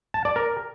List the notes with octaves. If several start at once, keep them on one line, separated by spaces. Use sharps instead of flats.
A5
D5
A#4